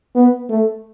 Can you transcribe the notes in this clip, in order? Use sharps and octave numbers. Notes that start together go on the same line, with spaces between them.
B3
A3